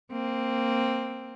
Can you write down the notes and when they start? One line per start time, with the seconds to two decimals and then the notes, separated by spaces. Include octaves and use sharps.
0.12 A#3 C4